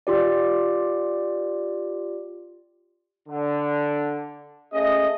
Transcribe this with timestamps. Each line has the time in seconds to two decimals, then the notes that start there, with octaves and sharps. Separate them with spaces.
0.07 F4 G4 D5
3.28 D3
4.73 A3 C#4 G#4 D#5